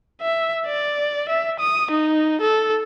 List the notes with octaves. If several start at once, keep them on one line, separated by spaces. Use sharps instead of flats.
E5
D5
E5
D#6
D#4
A4